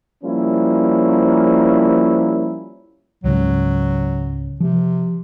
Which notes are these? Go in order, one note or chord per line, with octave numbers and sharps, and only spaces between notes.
F3 G3 A#3 C#4 E4
C#2 G#2 C#3 F#3
C3 F3